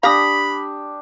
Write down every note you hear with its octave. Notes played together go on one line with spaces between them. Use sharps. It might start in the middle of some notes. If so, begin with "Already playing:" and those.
D4 G4 F5 B5 D#6 A#6 B6